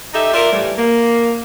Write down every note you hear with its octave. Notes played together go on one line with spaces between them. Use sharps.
D#4 G4 A4 E5
F4 A#4 D5 E5
A2 E3 G3
A#3